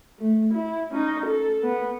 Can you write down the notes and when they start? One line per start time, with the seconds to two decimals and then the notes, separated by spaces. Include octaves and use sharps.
0.19 A3
0.54 E4
0.92 C#4 D#4
1.26 A4
1.63 B3